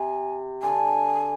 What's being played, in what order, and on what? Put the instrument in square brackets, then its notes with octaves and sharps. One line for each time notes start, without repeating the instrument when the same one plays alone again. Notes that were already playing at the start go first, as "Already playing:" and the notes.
Already playing: [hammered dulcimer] C3 [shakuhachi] G#5
[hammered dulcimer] D3 [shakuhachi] G#5